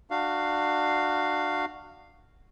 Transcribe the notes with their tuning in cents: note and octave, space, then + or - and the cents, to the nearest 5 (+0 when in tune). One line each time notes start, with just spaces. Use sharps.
D4 +30 F#4 +0 F5 +0